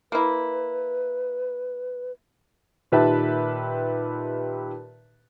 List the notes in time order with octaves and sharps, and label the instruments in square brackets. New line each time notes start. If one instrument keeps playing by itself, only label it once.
[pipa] A#3 E4 [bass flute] B4
[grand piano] A#2 D#3 G4 B4 E5 A5